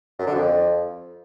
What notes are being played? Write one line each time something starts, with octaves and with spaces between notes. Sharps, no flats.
F#2
D3
F2